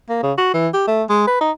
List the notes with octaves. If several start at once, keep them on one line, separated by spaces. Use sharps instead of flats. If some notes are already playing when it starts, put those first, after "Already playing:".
A#3
C#3
F#4
E3
G4
A3
G#3
B4
D#4